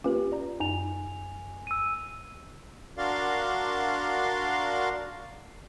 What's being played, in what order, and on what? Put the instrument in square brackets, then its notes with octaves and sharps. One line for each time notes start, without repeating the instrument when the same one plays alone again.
[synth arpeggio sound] A#3 C#4 B4 [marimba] F4 G4
[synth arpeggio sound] D5 A#5 G6
[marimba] F#2 [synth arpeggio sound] D#4 [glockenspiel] G#5 F7
[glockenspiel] E6 D#7
[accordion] D4 F#4 A#4 D5 F5 C6